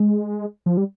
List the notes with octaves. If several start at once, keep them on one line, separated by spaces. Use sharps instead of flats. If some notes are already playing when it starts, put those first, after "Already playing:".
Already playing: G#3
F3
G3